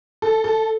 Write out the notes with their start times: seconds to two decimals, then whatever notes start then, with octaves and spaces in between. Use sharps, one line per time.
0.22 A4
0.44 A4